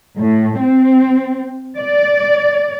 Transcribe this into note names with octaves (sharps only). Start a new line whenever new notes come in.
A2
C4
D5